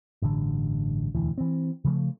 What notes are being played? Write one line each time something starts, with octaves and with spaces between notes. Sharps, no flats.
A1 G2 D3
E1 D2 E3
E3 C4
C#3 F3 A3